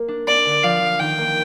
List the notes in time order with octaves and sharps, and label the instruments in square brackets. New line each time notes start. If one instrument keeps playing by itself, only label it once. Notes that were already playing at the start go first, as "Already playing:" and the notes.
Already playing: [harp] A#3
D4
[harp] A#3 [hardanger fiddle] D5
[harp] D3
[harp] F3 [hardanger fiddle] F5
[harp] F3
[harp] D#3 [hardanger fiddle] G5
[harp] A#3